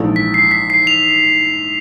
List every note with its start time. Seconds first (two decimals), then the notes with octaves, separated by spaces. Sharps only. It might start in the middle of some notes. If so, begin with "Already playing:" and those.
Already playing: A#1 G#2 E3 A3
0.16 B6
0.34 C7
0.51 B6
0.70 C7
0.87 F7